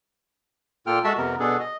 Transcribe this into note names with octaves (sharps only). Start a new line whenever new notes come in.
A#2 A#3 F4 A4 G5 F6
G#3 F#4 A4 E5 A5 E6
F2 C3 B3 A#4
B2 B3 D4 G#4 A4
D#5